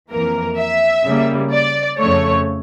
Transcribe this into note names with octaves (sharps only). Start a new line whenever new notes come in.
F2 E3 A#3 A#4
E5
C#3 G3 A#3
D5
F2 C#3 F3 A3 C#5